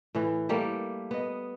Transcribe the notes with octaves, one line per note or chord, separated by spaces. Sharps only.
A2 E3
G3 A3 A#3 G4
B3 D#5